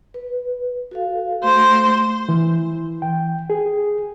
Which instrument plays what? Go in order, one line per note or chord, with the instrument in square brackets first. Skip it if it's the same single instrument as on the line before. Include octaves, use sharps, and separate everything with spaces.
[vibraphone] B4
F#4 A4 F5
[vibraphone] A3 [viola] C5
[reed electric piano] E3
G5
G#4